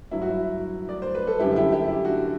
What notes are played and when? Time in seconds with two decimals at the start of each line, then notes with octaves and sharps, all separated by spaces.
0.11 G2 F#3 E4
0.22 F#4
0.31 E4
0.89 D5
1.02 C5
1.15 B4
1.27 A4
1.40 F#2 D3 G3 E4 G4
1.52 A4
1.56 E4 G4
1.72 E4 G4
1.88 E4
2.05 D4 F#4